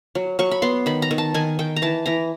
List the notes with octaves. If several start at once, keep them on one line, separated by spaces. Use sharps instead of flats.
F#3
F#3 C#6
B5
B3 C6
D#3 B5
A#5
D#3
A5
D#3 G#5
D#3 G5
A#5
E3 A5
E3 A#5